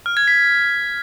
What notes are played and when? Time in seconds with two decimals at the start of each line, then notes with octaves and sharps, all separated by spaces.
0.06 F6
0.17 G#6
0.28 B6